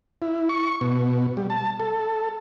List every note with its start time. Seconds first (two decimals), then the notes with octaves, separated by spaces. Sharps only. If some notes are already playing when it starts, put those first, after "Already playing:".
0.22 E4
0.49 C#6
0.81 B2
1.37 G3
1.50 A5
1.80 A4